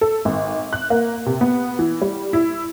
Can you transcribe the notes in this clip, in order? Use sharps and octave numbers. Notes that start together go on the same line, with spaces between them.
A4
G#1
F#6
A#3
C3
B3
E3
G3
E4